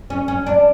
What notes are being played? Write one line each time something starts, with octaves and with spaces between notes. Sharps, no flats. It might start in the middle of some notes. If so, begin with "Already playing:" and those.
C#4
C#4
D4